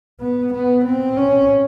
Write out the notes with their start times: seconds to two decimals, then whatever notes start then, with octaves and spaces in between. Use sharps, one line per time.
0.20 B3
0.53 B3
0.85 C4
1.17 C#4